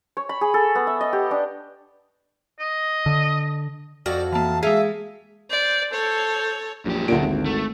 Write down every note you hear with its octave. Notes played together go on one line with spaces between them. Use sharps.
C#5
B5
G#4
A4
B3
E5
D#5
G4
D4
D#5
D3
F2 F#4 D5 F6
E3 A#3 A5
G#3 G#4 E5 F5
C5 D5
A4 C5 C#5
A#1 F#2 G4
D2 A#2 D7
G#1
A3